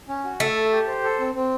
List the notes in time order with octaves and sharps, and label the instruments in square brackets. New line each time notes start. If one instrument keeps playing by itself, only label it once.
[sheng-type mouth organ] C#4
F#4
[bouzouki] A3 [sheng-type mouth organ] E5
[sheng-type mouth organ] A5
G4
C5
A4
C4
C4